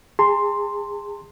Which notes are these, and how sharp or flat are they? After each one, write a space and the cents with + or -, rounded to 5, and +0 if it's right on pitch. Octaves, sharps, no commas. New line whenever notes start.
G#4 -25 A5 +45 C6 +0